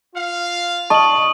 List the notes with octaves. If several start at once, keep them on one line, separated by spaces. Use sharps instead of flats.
F4 F5
D#5 A5 C#6 F#7